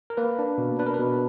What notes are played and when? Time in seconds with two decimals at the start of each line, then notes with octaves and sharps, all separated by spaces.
0.10 A#4
0.17 A#3 B4
0.39 D4
0.58 B2
0.79 D4 B4
0.86 A#4
0.94 B4
0.99 B2